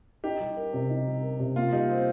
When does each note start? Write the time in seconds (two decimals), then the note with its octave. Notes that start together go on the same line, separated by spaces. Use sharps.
0.24 D#4 G4
0.40 G3
0.57 A#4
0.73 C3
0.90 D#4
1.07 G3
1.23 A#4
1.39 C3
1.56 A#3 F4
1.73 G3 D#4
1.90 C4